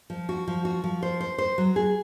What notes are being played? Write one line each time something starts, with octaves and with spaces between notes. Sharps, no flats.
F3
F#4
F3
F#4
F3
C5
C5
C5
F#3
G#4